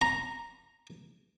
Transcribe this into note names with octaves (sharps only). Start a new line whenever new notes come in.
A#5